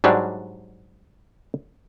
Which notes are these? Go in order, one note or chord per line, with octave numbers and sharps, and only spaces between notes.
G#2 F#3 G3 D4